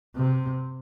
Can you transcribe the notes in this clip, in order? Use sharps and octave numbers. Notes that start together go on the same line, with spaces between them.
C3